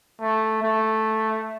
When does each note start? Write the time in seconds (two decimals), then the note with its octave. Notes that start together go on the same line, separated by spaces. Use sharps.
0.22 A3
0.62 A3